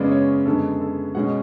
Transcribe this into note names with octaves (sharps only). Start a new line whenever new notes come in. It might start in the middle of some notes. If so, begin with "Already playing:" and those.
Already playing: F#2 C#3 G#3 B3 D5
C#5
F#2 D3 G#3 B3 A4
A4
B2 G#3 C#4 F#5